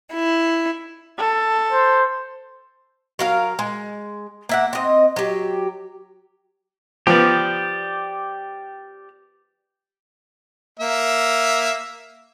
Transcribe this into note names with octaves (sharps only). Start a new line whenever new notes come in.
E4
A4
C5
F#3 A#4 F5
G#3
A#3 E5 F#5
C4 D#5
F#3 G4
F3 B3 G4 D5
A#3 E5